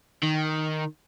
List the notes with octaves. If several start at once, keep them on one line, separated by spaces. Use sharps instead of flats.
D#3